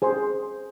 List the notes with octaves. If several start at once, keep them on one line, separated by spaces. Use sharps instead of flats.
G#4 C5 G#5 C6